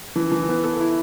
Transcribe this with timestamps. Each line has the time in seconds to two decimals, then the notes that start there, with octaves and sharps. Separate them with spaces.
0.16 E3
0.31 E3
0.49 B3
0.63 A4
0.80 E4